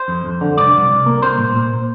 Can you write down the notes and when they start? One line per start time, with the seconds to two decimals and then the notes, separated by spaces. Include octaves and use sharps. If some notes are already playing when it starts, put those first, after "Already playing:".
Already playing: C5
0.08 F2
0.25 F2
0.41 D3
0.57 C2 D5
0.74 C2
0.89 C2
1.06 A#3
1.22 C2 C5
1.39 A#2
1.55 A#2